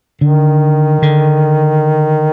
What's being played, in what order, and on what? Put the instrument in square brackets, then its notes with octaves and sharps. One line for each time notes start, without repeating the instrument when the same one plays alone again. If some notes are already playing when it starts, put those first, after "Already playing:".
[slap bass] D3 [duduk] D#3
[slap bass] D3